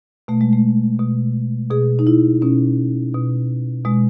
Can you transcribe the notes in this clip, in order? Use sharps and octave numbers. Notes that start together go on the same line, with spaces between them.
B2 A3
G#3
A3
B2
B2 G#4
D#4
E4
B2 C#4
B2
B2 G#3